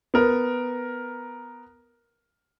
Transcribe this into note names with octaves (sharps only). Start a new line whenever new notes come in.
B3 A#4